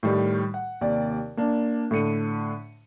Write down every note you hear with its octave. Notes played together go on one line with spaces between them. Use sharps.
A2 D#3 G3
F#5
D#2 C3 D5
A#3 D4
A2 D3 C#7 D#7